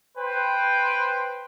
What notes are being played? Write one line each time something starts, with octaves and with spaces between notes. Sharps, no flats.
B4 C5 G5